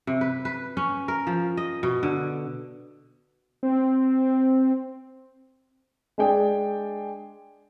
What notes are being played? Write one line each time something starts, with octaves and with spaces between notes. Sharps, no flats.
C3
B4
B4
C#4
A#4
F3
D#5
B2
D3
C4
G#3 D4 G#4 D5 G5